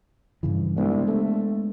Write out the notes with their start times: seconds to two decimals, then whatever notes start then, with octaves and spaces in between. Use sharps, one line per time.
0.43 G2 C#3 E3
0.77 C2 G#3 B3 D4
1.07 A3